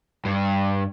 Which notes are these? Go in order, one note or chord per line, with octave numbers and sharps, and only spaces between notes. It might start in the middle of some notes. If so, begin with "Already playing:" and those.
G2